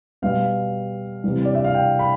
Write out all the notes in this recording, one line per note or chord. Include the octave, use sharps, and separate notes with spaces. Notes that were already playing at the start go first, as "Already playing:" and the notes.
B2 G3 F5
C3 E3 G3
D5
E5
F5
G5
B5